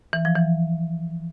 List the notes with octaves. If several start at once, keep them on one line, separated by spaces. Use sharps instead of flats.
E3
F3
E3